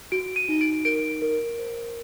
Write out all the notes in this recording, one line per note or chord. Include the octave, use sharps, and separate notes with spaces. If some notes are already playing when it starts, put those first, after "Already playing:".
F#4 D7
D#7
D#4
D7
A#4 D7
A#4
C5